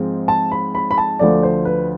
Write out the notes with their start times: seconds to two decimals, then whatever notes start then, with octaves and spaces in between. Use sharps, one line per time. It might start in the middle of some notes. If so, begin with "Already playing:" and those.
Already playing: G#2 F3 G#3 C4
0.28 A5
0.52 B5
0.75 B5
0.91 B5
0.98 A5
1.19 D2 D3 F3 A3 D5
1.43 C5
1.65 B4